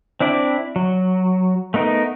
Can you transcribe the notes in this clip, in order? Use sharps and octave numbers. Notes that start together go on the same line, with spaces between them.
C4 D4 E4 D5
F#3
A3 B3 D#4 A#4